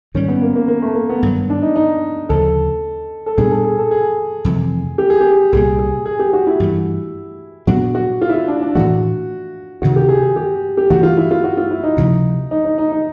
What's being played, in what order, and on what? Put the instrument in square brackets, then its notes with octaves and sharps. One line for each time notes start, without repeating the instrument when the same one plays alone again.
[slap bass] G#2 D#3 G3 [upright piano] C#4
[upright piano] B3
A#3
A#3
A#3
A3
A#3
B3
[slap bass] G2 D#3 F#3
[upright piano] D4
D#4
D#4
[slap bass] D2 C#3 F3 [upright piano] A4
[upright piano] A4
[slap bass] A#2 G3 B3 D4 [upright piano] G#4
[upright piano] A4
G#4
A4
G#4
[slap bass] F2 C3 E3 A3
[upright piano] G4
G#4
G4
[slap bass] C2 A#2 G3 [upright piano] G#4
[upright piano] G#4
G#4
G4
F#4
E4
[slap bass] G2 E3 A3
[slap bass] A#2 F#3 B3 D4 [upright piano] F#4
[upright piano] F#4
F4
E4
F4
D4
D4
[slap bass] A2 E3 A3 [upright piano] F#4
[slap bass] D2 C3 D#3 [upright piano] F#4
[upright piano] G4
G#4
G#4
G4
G4
[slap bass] G2 E3 A3 [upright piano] F#4
[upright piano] F4
E4
F4
F#4
F4
E4
D#4
[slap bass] D2 C3 F3 A3
[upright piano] D#4
D#4
D#4
D#4